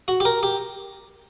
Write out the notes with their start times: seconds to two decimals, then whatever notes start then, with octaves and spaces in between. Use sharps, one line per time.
0.08 F#4
0.20 G4
0.25 A#4
0.43 G4